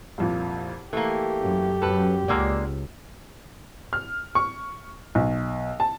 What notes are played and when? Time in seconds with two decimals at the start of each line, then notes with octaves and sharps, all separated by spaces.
0.18 C2 F2 A#2
0.93 E3 A3 A#3 G4
1.42 F#2
1.82 F#2 A4 B4
2.28 C#2 G#3 A#3 D5 F#5 E6 F6
3.93 F6
4.35 C#6
5.15 B1
5.80 A5